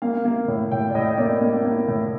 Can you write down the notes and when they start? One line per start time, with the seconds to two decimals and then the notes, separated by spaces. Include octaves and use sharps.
0.02 A#3 F5
0.25 A#3
0.48 A2
0.72 A2 G5
0.90 D5
0.95 A2 D#5
1.17 A#3 D5
1.42 A#3
1.65 A#3
1.88 A2